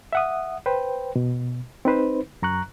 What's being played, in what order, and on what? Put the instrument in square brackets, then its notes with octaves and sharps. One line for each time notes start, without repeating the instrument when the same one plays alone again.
[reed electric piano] E5 F#5 D#6
B4 C5 G5
B2
C4 D#4 B4 C5
F#2 A#5 C#6 F#6